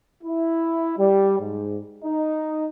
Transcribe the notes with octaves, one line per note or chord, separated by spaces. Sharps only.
E4
G3
G#2
D#4